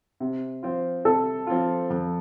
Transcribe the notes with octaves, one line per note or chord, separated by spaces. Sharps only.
C3
F3 C4 F4
C3 A4
F3 C4 F4
F2